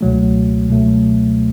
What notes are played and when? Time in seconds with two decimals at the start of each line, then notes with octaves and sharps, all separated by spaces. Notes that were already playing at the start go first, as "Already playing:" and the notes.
0.01 C#2 B2 F#3 A3
0.69 C#2 B2 F#3 A3